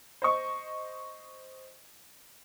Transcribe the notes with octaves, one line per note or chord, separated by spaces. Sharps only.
C5 D#5 C#6